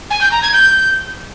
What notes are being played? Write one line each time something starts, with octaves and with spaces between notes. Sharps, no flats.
G#5
G6
A#5
G#6
G6